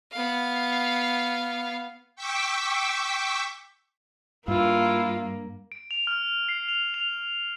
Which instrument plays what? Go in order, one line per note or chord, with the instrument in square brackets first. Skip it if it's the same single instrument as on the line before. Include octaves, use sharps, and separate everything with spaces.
[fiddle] B3 F5
[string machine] G5 C#6 D6 E6 B6
[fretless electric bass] G2 [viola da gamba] A#3 [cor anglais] E4 [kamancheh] F4
[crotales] D7
F7
F6
C7
F7
F7